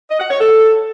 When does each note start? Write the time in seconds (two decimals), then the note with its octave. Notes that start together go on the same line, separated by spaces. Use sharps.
0.09 D#5
0.20 F#5
0.30 C#5
0.40 A4